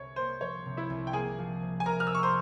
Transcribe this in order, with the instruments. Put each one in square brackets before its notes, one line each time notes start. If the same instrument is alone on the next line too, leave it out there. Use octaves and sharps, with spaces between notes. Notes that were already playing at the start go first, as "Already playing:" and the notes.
Already playing: [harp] C2 [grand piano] C#5
[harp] A#3 [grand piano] C5
[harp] F3 [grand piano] C#5
[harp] C3
[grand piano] E4 E5
[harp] C2
[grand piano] G5
[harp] A#3 [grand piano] G#4 G#5
[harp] F3
C3
[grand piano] G#5
[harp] C2 [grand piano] A#4 A#5
[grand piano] F6
E6
[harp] A#3 [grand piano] C#6
[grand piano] C5 C6